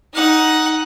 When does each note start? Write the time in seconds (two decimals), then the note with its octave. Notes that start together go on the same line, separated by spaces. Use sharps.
0.14 D#4 F#5